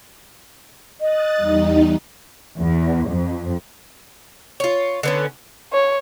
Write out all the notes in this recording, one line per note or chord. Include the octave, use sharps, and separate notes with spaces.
D#5 D#6 F#6 A6
E2 G3 D#4
E2
F2
F4 C#5
D3 B3 C#4
C#5